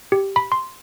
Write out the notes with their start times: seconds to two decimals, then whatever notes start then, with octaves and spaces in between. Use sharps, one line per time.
0.12 G4
0.36 B5
0.52 C6